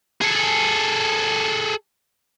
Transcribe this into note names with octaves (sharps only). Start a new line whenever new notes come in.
G#4 A4